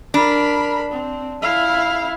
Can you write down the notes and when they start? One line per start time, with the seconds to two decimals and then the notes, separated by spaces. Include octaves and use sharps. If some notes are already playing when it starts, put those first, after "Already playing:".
0.14 D4 A#4 B5
0.92 C4
1.42 E4 F5